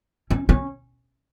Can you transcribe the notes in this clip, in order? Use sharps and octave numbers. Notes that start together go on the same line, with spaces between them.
C#4
C#4